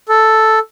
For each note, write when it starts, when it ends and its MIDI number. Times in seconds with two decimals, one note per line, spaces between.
0.09 0.59 69